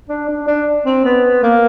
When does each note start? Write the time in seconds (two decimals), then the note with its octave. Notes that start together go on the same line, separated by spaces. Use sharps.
0.09 D4
0.29 D4
0.48 D4
0.86 C4
1.05 B3
1.43 A#3